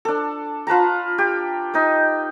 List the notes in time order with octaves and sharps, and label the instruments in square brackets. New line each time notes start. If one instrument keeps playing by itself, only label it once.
[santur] D4 A4
F4 B4 A5 A#5
G4
D#4 D#5